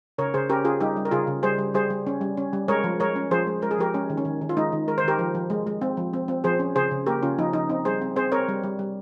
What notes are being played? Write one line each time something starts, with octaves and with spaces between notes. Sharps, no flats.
C#3 A#4 C#5
C#3 G#4 C5
C#4 G4 A#4
C#4 F4 G#4
G3 D#4 G4
G3
A#4
C#3 F4 G#4
C#3
G3 G#4 C5
G3
G3 G#4 C5
G3
C#4
G3
C#4
G3
G#3 A#4 C#5
F3
G#3 A#4 C#5
C#4
F3 G#4 C5
G#3
G#3 A#4
G#4
F3 G4 A#4
G#3 C#4
D#3
C#4
D#3
D#3
F4
G#3 D#4
D#3
G#3 A#4
C5
D#3 G4 A#4
F3
F3
G#3
G#3
C4
F3
C4
C4
F3 G#4 C5
C#4
C#3 G#4 C5
C#3
A#3 G4 A#4
C#3 C#4 F4
F3 D#4
F3 D#4
C4 D#4
G3 G#4 C5
C4
C4 G#4 C5
C4 A#4 C#5
G3
G3
G3